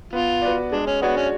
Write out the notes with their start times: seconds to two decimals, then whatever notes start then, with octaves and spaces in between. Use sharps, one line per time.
0.13 B3 F4
0.42 F#4 B4 D5
0.72 G#3 D4
0.87 C#4
1.02 B3 D4 F#4 C#5
1.17 C#4